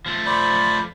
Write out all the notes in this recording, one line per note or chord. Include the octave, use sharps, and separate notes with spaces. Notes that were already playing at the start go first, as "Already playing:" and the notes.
F3 A3
C5 D5 B5